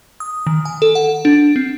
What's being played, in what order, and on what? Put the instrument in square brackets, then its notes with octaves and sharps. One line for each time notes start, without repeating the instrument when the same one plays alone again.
[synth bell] D#6
D#3
G#5
A4
F#5
D4
C4